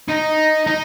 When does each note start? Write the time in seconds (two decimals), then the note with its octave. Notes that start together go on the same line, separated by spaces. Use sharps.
0.09 D#4
0.67 D#4